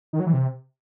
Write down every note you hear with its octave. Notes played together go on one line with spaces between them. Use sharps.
D#3
F#3
E3
C3